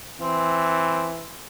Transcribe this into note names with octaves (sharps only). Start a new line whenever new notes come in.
E3 C4